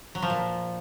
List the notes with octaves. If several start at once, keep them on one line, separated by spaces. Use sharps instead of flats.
F#3
F3
A#2